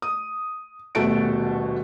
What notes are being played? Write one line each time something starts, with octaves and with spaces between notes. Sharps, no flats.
D#6
D#1 B2 A3 F#4 A5 D7